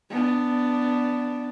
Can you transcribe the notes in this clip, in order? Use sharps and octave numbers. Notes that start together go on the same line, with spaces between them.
B3 D4